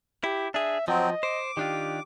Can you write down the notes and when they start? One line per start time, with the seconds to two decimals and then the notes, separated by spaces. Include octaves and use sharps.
0.24 E4 G4
0.54 D4 G#4 E5
0.88 F3 F#3 C4 D#5
1.23 C5 D6
1.57 D#3 D4 F4 G4